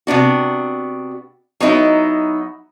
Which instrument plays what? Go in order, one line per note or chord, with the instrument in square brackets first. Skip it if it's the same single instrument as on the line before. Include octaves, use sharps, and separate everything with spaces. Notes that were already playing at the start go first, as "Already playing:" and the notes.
[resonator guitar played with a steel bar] C3 B3 D4 F#4
F#3 B3 D#4 E4